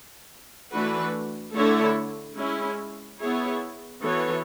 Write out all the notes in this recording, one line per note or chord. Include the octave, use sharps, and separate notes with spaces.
E3 A3 D4 F#4 B4
D3 A3 E4 A4 C#5
G#3 C#4 E4
B3 E4 G#4 C#5
E3 B3 F#4 A4 C#5